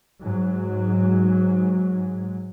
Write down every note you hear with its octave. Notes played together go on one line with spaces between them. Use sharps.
G#2 F#3